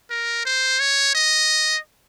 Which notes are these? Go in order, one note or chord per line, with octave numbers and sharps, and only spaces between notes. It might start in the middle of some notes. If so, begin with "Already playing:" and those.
A#4
C5
C#5
D#5